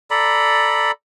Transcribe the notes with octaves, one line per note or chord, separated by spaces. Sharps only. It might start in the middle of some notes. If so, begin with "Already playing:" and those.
A4 D5 A#5 B5